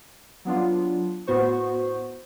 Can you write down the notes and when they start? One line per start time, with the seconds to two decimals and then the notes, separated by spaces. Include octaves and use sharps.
0.45 F#3 B3 D4 F4
1.27 A2 B3 F#4 C5 C#6